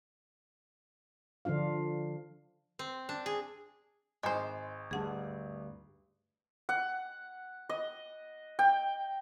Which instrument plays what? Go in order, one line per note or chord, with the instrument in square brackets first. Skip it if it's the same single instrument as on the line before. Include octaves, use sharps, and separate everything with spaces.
[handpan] D3 F3 D4 F4 F5
[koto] C4
D4
G#4
[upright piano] G#1 [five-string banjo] G#3 C5 [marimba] G#5
[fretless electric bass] D2 G2 [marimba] G#4 F#5 A5
[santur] F#5
D#5
G5